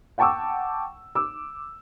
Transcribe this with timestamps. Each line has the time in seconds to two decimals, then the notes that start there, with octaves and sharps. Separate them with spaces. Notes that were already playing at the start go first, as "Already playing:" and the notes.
0.18 F#5 G5 A5 C#6 D6 E6
1.15 D6 E6